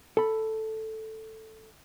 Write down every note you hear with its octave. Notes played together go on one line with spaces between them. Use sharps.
A4 B5